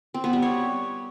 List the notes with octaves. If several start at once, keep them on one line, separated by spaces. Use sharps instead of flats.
C4
B3
G3
C#5